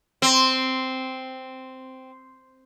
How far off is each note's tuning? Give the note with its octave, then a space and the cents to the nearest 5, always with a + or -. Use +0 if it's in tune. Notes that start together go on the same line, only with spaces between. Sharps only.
C4 -5